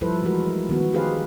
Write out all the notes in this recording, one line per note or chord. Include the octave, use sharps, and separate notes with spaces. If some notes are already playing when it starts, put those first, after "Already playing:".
F3 G3 E4 A4 B4 C5
E3 G#3 A3 F#4 A#4
D#3 B3 F#4
D#4 G4 G#4 B4 C5 F5